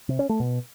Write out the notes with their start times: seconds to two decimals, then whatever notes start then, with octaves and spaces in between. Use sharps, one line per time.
0.09 C3
0.19 C#4
0.29 A3
0.40 B2